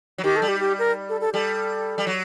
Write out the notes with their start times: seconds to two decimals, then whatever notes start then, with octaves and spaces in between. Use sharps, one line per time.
0.18 F#3
0.24 D#3 G4
0.36 A4
0.42 G3
0.48 G4
0.60 G4
0.79 A#4
1.09 A4
1.21 A4
1.34 G3 A4
1.98 G3
2.07 F#3